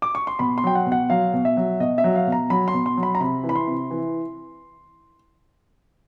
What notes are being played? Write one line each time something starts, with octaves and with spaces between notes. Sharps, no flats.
D6
C#6
C6
B2 B5
C6
F#3 G5
F#5
B2
F#5
F#3 F5
B2
E5
F#3
B2 D#5
E5
F#3
F5
B2
A#5
F#3 B5
C6
B2
C6
F#3
B5
A#5
C3 B5
E3
B5
C6
C3
E3